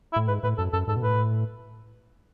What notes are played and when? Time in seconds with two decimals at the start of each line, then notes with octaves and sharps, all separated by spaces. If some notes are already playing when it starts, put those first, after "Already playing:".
0.13 E4
0.16 A2
0.28 G#2 B4
0.43 A2 B4
0.58 F#2 A4
0.73 F#2 A4
0.88 G#2 A4
0.96 B2
1.02 A2 B4